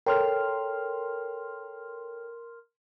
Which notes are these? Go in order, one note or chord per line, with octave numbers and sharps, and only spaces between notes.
A4 A#4 C#5 G5 C6 F6